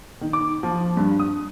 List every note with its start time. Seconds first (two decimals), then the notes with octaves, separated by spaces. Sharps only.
0.21 D#3
0.33 D6
0.63 F3
0.97 G2
1.20 D#6